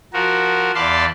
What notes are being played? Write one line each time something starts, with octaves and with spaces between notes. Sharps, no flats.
F3 F#4 A#4
E2 D5 F5 A5 B5 C6